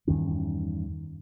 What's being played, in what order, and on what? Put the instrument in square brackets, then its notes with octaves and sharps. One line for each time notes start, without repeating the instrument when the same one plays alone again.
[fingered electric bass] E2 G2 D#3 C#4